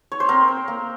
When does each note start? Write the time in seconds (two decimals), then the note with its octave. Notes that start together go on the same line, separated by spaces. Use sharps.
0.12 C#5
0.20 C5
0.29 C4 A#4
0.48 C4
0.68 A#3